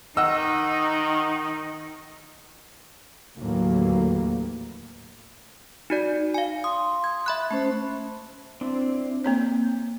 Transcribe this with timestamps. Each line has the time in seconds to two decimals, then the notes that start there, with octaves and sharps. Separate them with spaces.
0.17 D#3 D#4 D#5 F#5 E6
3.37 D#2 A2 D3 E3 F#3 A#3
5.90 D#4 F#4 D5
6.34 F5 G#5
6.64 C6 D#6
7.04 G#6
7.26 E5 B5 F#6
7.51 A3 C#4 C5
8.61 C4 D4 E4
9.24 A#3 C4 C#5 G6